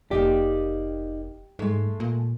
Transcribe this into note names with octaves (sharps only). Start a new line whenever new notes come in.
F1 A#3 D#4 G4 D5
G#2 G#3 A3
A#2